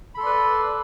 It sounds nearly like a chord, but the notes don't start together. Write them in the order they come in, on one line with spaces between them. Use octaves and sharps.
B5 A4 C6 D5 B4